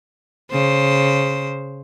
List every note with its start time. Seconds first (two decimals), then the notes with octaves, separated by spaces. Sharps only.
0.52 C#3 C5